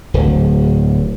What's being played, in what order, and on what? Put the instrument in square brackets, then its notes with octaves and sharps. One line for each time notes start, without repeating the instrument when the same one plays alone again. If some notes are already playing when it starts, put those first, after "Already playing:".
[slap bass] D1